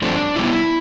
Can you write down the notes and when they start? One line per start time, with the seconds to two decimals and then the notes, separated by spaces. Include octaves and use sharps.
0.02 G2 F3 A3 C4 D4
0.36 C3 G3 B3 E4